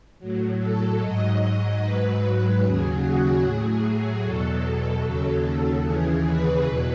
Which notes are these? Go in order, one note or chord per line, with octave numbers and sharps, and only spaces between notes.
A2 F#3
A4
G#2 F#3 D#5
G#2 F#3 B4
D#2 C#3 F#3 G#4
F#4
A2 F#3 G#4
E2 B2 F#3 A4
D#2 C#3 F#3
D#2 C#3 E3 G#4
B4
E2 B2 F#3